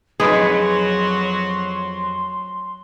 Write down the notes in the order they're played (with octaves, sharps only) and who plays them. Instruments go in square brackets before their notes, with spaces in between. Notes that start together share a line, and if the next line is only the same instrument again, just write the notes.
[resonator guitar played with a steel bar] F2 D#4 B4 [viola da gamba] F#3 [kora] G#4 [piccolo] C6